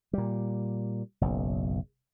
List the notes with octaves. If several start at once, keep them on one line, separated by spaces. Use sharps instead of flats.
A#2 G3
F#1 B1